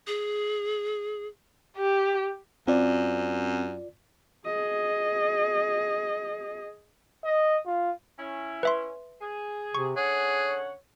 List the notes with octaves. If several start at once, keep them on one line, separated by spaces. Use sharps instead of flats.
G#4
G4
F#2 C4 F4 D5
G#4 D#5
D#5
F4
C#4 E4
B4 E5 C6
G#4
C3 C#6
D3 C#4 G#4 C#5 F#5